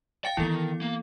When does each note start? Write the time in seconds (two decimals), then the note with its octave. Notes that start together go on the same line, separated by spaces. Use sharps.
0.25 F5 G5 A6 C#7
0.37 D#3 E3 B3 E4 A4
0.82 A#3